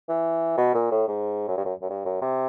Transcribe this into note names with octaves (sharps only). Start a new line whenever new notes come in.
E3
B2
A#2
A2
G#2
F#2
G2
F#2
F#2
G2
F#2
C3